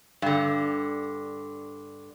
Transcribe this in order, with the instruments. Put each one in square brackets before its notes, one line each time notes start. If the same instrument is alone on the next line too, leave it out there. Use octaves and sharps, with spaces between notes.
[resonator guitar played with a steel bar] G2 D3